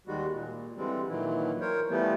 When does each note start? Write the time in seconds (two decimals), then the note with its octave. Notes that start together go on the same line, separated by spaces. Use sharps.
0.07 D#2 D#3 G3 G#3 F#4
0.33 A#2
0.77 D3 E3 G3 G#3 C4
1.08 A#2 D#3 E3 F#3 E4
1.61 A#4 C5 C#5
1.90 E3 F3 G3 A3 B3